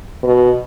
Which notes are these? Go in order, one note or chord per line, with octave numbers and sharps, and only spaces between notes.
B2